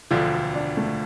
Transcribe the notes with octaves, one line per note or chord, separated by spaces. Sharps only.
E1 D2 D3 F3 F4
D4
A3